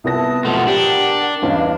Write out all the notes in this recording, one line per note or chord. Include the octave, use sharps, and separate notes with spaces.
C2 B3 E4 A5 D#6 A#6
B2 F3 A3 A#4 F#5
D4 G4
E2 G2 C#4 D#5 F5